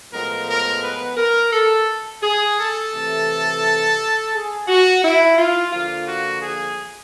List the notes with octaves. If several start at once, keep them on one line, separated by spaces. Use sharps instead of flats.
A2 F3 G#3 B3 A#4
A#4
B4
A#4
A4
G#4
A4
C3 E3 A3
G#4
F#4
E4
F4
D3 F3 A#3 F4
F#4
G#4